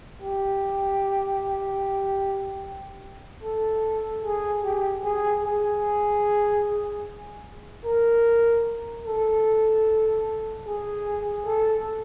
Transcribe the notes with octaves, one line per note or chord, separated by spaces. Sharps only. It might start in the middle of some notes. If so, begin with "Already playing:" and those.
G4
A4
G#4
G4
G#4
G#4
A#4
A4
G#4
A4